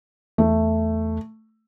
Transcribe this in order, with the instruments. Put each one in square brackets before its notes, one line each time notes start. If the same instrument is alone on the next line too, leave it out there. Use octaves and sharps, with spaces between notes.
[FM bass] E2 [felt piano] A3